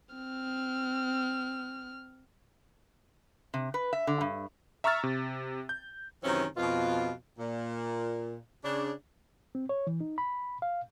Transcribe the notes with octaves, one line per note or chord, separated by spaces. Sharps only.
C4 F6
C3
B4
E5
D3
G2
E5 A#5 C#6 E6 F6 A6
C3
G6
F#2 C3 D#3 E3 C4 C#4
F2 B2 F4
A#2
C#3 D4
C4
C#5
E3
D#4
B5
F5